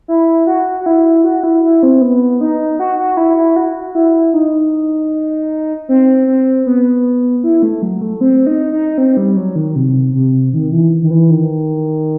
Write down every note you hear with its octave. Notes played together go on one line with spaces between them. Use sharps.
E4
F#4
F#4
E4
F#4
E4
E4
C4
B3
D#4
F#4
F#4
E4
E4
F#4
E4
D#4
C4
C4
B3
E4
A3
F#3
A3
C4
D#4
D#4
C4
G3
F#3
D#3
C3
C3
D#3
E3
D#3
E3
D#3